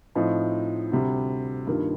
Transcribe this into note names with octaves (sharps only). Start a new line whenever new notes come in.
A2 F3 C4 D#4
D2 C3 G3
G2 D#3 G3 A#3 F4